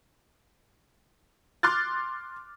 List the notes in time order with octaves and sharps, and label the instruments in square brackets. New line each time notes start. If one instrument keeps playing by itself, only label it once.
[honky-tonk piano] C6 D6 F6 F#6 A6